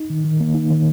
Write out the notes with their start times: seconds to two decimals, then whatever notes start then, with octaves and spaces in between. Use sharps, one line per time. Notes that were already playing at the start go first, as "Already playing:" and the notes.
Already playing: D#4
0.10 D#3
0.24 D#3
0.40 A#3
0.55 D#4
0.70 D#3